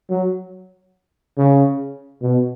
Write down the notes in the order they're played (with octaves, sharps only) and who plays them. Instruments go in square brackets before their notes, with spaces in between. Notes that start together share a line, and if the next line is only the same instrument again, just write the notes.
[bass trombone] F#3
C#3
B2